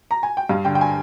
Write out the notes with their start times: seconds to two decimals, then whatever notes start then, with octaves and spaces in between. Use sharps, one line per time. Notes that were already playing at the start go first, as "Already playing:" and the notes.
0.11 A#5
0.23 G#5
0.37 G5
0.49 G2 F5
0.65 D3 G5
0.75 G5
0.81 G#5